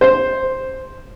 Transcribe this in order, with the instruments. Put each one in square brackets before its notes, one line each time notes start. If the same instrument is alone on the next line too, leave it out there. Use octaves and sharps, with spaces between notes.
[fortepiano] C5